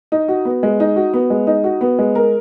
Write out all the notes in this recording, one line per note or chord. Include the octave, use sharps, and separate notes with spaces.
D#4
F#4
B3
G#3
D#4
F#4
B3
G#3
D#4
F#4
B3
G#3
A#4